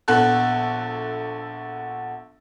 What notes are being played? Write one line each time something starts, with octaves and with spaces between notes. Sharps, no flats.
A#1 B3 A4 F#6